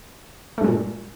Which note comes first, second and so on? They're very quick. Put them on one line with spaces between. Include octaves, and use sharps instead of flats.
A3 G2 G#3 A#2